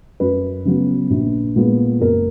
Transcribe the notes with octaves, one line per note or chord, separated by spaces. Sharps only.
F#2 B4
C#3 F#3 B3
A#1
A#2 G#3 B3
F#1 A#4